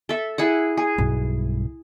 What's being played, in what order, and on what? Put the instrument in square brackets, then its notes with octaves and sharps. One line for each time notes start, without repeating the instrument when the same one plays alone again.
[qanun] A4 E5
E4 G#4 F#5
G#4
[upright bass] B1 G2